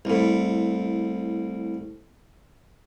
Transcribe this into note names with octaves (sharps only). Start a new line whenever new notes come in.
C2 A2